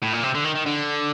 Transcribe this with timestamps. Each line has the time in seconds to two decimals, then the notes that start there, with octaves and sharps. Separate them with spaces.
0.03 A2
0.14 A#2
0.24 C3
0.35 D3
0.45 D#3
0.55 D#3
0.66 D3